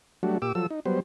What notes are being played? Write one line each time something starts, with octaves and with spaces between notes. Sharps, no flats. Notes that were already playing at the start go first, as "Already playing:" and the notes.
F#3 G3 A3 D4 F#4
A#2 G4 D6 E6
F3 F#3 A4 E6
D#4
F#3 G3 B3 C5